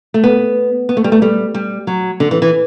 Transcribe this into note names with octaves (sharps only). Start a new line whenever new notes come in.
A3
B3
B3
A3
G3
A3
G3
G3
F#3
D3
E3
E3